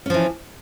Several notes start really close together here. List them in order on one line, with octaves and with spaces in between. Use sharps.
C#4 F3 E3